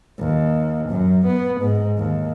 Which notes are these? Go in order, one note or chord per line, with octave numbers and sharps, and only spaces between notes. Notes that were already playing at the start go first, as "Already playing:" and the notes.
D#2
F#2
B3
G#2
D#2